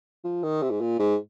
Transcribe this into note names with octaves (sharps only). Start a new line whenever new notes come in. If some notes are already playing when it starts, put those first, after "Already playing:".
F3
D#3
C3
G#2
A#2
G#2